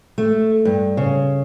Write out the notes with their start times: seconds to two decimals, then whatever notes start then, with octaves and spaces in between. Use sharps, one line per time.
0.18 A3
0.65 G2
0.97 C#3